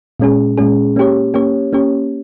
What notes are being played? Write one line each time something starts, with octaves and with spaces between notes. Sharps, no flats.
A#2 G#3 C#4 G#4
A#2 G#3 C#4 G#4
A#3 C#4 G4 C#5
A#3 C#4 G4 C#5
A#3 C#4 G4 C#5